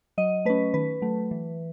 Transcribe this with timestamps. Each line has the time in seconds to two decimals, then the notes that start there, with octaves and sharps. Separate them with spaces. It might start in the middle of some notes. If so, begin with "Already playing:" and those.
0.18 F#3 D#5
0.45 A3 C#4 B4
0.74 D#3 B4
1.02 F#3 A3
1.31 E3